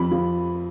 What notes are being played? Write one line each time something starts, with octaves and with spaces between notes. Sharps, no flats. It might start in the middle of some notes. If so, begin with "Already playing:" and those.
Already playing: F2 B5
F3